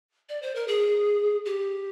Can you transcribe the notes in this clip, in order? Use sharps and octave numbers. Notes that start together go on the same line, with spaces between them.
D5
C5
A#4
G#4
G4